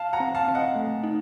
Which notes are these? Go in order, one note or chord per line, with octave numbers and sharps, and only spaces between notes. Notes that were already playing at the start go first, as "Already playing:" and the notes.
Already playing: F5 A5
F#5 A#5
C4
F5 A5
C4
D#5 F#5
A3
D#4